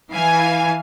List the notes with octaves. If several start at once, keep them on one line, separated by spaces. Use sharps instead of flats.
E3 F5 G#5